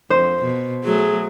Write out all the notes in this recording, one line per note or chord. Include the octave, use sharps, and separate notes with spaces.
F2 C5
B2
F#3 A3 G#4